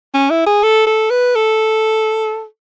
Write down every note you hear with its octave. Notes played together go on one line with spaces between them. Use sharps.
C#4
E4
G#4
A4
A4
B4
A4